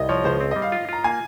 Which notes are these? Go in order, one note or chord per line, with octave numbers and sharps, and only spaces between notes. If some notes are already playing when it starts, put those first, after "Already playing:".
Already playing: C2 D#5
F3 C#5
C#2 C5
C4
G3 D#5
F5
F4
F4 A#5
A#3 G#5